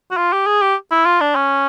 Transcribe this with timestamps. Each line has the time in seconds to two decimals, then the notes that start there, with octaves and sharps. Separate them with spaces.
0.11 F#4
0.17 F4
0.33 G4
0.46 G#4
0.62 G4
0.91 E4
1.05 F4
1.21 D4
1.35 C#4